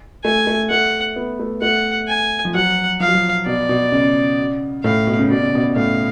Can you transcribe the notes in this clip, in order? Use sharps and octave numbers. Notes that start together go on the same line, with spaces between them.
A3 G#5
A3
A3 F#5
B3
A3
A3 F#5
G#5
F3
F#3 F#5
F3 F5
F#3
F3
B2 D5
B2
C#3
A2 F5
B2
C#3
B2 D5
C#3
B2
A2 F5